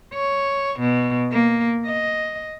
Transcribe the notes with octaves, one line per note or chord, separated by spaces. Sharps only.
C#5
B2
A#3
D#5